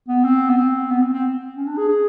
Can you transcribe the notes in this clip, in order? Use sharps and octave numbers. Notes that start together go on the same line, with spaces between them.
B3
C4
B3
C4
B3
C4
C4
C#4
D4
G#4
G#4